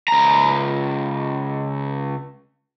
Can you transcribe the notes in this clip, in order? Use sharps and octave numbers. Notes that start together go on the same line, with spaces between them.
C#2 A#5